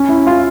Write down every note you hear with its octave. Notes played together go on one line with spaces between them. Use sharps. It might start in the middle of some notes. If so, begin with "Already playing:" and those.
Already playing: C#4
E4
F4